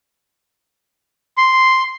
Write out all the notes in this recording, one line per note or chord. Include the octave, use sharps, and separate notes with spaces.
C6